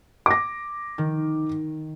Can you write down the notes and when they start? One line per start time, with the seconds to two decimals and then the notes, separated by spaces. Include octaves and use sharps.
0.26 D6 A#6
0.98 D#3